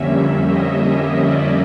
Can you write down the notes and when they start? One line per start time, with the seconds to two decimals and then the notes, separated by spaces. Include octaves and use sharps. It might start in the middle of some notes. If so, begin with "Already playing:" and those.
Already playing: F2 D3 G3 A#3 C#4 E5
0.47 D#5
1.23 D5